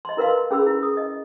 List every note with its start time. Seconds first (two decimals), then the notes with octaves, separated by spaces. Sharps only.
0.05 D#5 C6
0.17 E4 A#4 B4 F5 C6
0.51 C#4 G#4 B5 E6
0.67 E4
0.83 D#6
0.97 D#5